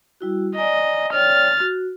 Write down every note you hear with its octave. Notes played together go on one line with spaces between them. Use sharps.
G3 E4 F#4
D5 D#5 G#5 A#5
C#5 D5 G5 F6 A6
F#4